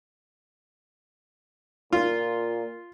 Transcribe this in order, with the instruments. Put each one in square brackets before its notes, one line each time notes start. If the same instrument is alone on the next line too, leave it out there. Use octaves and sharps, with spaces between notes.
[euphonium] A#2 [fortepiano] F4